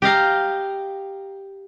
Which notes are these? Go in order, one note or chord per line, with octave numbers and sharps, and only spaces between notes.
G4 D#5 F5 A#5